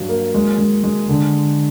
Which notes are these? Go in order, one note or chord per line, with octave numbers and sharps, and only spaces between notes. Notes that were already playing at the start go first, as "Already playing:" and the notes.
Already playing: G2 F#3
A#3
G#3
G#3
G#3
D3